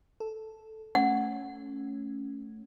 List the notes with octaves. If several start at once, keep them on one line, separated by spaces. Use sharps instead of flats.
A4
A3 C#4 F#5